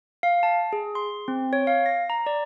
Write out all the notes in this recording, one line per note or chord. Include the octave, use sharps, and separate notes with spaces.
F5
A5
G#4
C6
C4
C#5
F5
A#6
A#5
D5